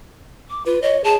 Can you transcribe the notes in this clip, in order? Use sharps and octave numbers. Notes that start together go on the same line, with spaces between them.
D6
F4 B4
C#5 D#5
G#4 A5